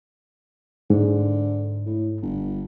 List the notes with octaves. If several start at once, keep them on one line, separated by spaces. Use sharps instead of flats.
G#2 D3
A2
G1